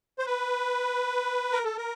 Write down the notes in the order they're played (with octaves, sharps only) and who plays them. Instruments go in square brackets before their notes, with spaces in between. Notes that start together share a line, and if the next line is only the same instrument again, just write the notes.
[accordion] C5
B4
A#4
A4
A#4